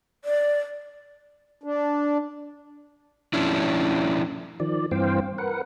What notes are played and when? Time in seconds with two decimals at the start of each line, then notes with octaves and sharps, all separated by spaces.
0.25 D5
1.63 D4
3.33 F3 C#4 D4 E4
4.60 D#3 F3 D5
4.91 G2 E3 C4 C5 F5 G5
5.38 A#4 B4 F#5